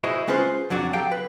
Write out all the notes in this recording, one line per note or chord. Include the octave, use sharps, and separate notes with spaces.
E4 F#4 G#4 C5 D#5
G#3 C#4 F4 B4 C5
F2 F#3 D4 F#4
F#3 G4 A4 F5 G5
B4